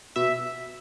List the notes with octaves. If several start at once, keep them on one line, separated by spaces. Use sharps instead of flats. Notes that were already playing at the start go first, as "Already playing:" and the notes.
B2 E5